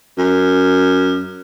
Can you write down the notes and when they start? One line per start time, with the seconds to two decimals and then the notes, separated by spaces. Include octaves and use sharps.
0.18 F#2